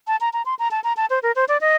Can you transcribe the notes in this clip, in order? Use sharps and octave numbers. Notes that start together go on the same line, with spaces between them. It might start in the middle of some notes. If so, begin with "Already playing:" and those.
A5
A#5
A#5
C6
A#5
A5
A#5
A5
C5
A#4
C5
D5
D#5